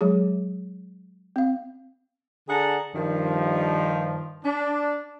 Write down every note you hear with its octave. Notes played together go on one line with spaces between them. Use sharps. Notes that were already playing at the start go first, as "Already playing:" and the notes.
F#3 G#3 G#4
C4 F5
D3 D4 G#4 F#5 A5 A#5
G2 D#3 F3
D4